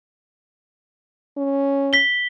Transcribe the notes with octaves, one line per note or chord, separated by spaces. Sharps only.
C#4
B6 G7